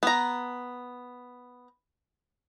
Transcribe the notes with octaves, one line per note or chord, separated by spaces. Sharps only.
B3 A#5